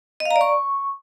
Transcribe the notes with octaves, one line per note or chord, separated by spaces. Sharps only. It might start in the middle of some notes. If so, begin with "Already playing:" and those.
D#5
F5
A#5
D5
C#6